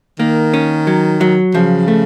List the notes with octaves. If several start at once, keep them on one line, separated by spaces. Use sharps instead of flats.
D#3 A#3
C#4
F#3
F#3
C#3 F3
A3